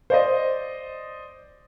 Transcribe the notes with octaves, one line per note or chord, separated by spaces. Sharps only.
C5 D5 D#5